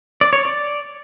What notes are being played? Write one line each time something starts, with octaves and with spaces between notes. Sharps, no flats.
D5
C#5
D5